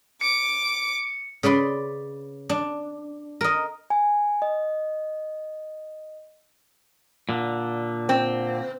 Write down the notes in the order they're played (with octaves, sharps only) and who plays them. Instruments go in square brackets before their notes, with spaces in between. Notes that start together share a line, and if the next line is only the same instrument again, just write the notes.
[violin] D6 [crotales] C#7
[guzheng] C#3 B4 D5 C6
D4
A#4 D#5
[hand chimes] G#5
D#5
[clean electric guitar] A#2 D3
[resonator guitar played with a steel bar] C4